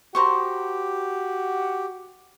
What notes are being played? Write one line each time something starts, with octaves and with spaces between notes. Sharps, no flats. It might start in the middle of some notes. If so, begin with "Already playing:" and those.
F#4 G4 A#4 C5 C#6